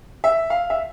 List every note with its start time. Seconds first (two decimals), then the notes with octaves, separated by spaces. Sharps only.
0.24 E5
0.50 F5
0.70 E5